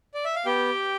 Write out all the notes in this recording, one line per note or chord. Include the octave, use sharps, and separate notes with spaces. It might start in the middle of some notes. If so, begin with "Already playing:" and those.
D5
E5
F5
B3 G4 G5